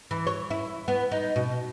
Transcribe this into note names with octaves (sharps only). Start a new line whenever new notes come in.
E3
C#5
E4
B3
D#4
B2